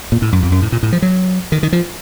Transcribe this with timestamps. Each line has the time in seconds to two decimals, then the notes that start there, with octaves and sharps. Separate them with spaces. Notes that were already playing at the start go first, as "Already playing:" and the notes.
0.12 A#2
0.22 A2
0.32 F#2
0.43 F2
0.52 F#2
0.62 A2
0.72 A#2
0.83 A2
0.93 F3
1.02 F#3
1.52 D#3
1.63 D#3
1.73 F3